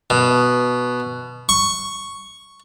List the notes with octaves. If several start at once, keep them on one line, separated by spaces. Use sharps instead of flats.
B2
C#6